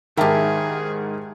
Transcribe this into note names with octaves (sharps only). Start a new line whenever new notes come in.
G#2 D#3 E4 G4 G#4 A#4 G5 A5